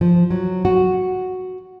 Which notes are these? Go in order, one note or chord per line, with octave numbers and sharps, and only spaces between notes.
F3
F#3
F#4